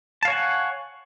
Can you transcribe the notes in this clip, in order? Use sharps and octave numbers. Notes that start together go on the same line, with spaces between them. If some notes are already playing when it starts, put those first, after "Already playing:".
C#5 F5 F#5 G#5 A5